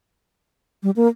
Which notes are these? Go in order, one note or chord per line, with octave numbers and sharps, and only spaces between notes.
G3
A#3